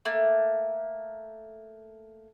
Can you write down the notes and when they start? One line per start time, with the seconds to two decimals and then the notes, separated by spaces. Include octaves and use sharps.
0.05 A3 A#3